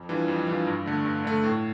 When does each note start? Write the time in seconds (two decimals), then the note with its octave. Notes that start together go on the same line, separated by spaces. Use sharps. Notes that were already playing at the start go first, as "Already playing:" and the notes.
Already playing: F2
0.09 E3 G3 D4 F4
0.28 F2
0.48 E3 G3 D4 F4
0.67 G2
0.86 D3 A3
1.05 G2
1.25 D3 A3
1.44 A2